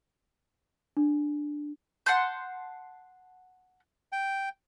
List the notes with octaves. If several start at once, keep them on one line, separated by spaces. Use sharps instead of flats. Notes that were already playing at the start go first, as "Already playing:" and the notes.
D4
F#5 A5 C6 G6
G5